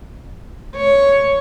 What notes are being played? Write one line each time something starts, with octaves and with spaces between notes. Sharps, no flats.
C#5